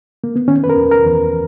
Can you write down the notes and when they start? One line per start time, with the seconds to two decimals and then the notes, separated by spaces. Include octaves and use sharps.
0.24 A#3
0.36 B3
0.48 D#3 C#4
0.64 B4
0.70 A#4
0.77 E2
0.91 A#4
1.06 E2